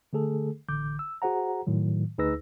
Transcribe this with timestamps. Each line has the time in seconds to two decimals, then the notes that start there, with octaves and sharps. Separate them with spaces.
0.13 D3 A3 G#4 A4
0.69 A1 D3 D6 G6
0.99 E6
1.22 F#4 G#4 C5 F#5 A#5
1.67 A2 D#3 F#3
2.18 D2 D#4 G#4 B4 E6 A#6